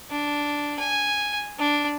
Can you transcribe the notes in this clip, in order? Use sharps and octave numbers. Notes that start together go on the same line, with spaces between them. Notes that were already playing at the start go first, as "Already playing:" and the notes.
D4
G#5
D4